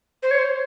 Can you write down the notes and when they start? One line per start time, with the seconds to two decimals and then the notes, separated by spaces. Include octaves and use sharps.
0.23 C5
0.31 C#5
0.39 C5